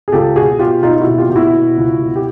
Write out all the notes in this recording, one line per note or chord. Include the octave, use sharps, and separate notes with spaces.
G#4
C#2 G4 A4
B2 F#4 G#4
B2 F4 G4
B2 D#4 F4
F4
E4 F#4
B2
F4 G4
B2 G4
E4 F#4
B2
C#2
B2
G4